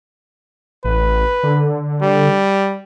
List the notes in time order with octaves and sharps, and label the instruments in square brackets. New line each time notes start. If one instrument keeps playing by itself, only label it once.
[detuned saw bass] A1 [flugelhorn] B4
[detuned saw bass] D3
[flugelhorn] G3